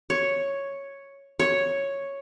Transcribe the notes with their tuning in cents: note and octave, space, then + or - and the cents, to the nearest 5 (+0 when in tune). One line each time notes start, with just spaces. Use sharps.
C#5 +0
C#5 +0